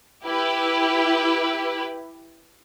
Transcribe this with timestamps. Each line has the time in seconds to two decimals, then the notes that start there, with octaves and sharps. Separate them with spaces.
0.25 E4 G4 B4